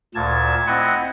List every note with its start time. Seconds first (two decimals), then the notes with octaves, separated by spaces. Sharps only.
0.15 D2 A#2 A5 G#6
0.67 C4 E4 D#5 F#5